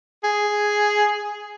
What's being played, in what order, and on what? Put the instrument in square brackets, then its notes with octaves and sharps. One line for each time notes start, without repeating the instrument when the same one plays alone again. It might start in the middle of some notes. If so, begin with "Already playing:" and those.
[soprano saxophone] G#4